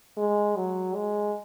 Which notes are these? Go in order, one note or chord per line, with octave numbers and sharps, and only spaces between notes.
G#3
F#3
G#3